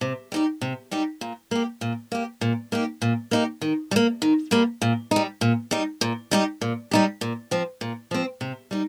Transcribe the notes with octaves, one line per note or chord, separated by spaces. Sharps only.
C3
G3 D#4 G4
C3
G3 D#4 G4
A#2
A#3 G4
A#2
A#3 G4
A#2
A#3 D#4 G4
A#2
A#3 D#4 G4
D#3
G3
A#3
D#3
G3 A#3
A#2
G3 D#4
A#2
G3 D#4
A#2
G3 D#4 G4
A#2
G3 D#4 G4
A#2
F3 C4
A#2
F3 C4
C3
G3 D#4